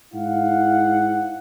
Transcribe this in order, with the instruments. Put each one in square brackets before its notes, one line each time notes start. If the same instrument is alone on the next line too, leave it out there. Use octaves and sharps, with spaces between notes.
[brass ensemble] G#2 E4 F5 F#5